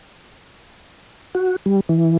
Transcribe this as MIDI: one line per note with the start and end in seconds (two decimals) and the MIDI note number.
1.35 1.56 66
1.66 1.80 55
1.89 2.17 52